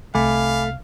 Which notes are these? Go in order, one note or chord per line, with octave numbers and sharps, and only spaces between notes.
C2 A3 F5 G#5 B5 D6